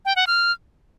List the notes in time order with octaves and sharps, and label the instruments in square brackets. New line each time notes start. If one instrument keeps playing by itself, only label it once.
[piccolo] G5
F#5
F6